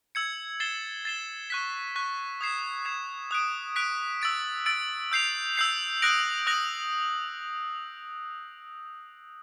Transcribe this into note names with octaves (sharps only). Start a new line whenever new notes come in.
E6 G#6 C#7
A6 C7 E7 G7
A6 C7 E7 G7
C#6 F#6 B6
C#6 F#6 B6
D#6 G#6 C7 E7
D#6 G#6 C7 E7
D#6 F#6 B6 D7
D#6 F#6 B6 D7
E6 A6 D7
E6 A6 D7
E6 G6 C7 F7
E6 G6 C7 F7
D#6 F#6 A#6 D7 F#7
D#6 F#6 A#6 D7 F#7